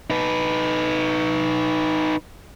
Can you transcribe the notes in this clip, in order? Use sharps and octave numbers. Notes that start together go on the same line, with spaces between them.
D#4 B4